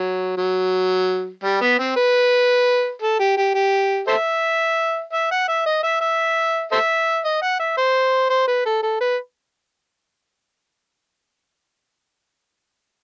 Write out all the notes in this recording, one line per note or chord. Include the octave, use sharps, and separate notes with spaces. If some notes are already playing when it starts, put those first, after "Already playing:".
Already playing: F#3
F#3
G3
B3
C4
B4
A4
G4
G4
G4
A4 C5 E5
E5
F#5
E5
D#5
E5
E5
A4 C5 E5
D#5
F#5
E5
C5
C5
B4
A4
A4
B4